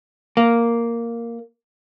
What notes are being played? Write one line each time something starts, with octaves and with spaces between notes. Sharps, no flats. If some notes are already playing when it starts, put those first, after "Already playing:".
A#3